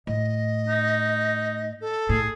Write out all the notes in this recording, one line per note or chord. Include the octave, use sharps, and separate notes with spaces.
A2 D#5
D#4
A4
A2 G#4